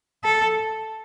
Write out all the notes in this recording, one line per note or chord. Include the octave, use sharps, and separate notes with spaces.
A4